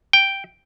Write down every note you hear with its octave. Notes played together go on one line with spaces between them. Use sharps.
G5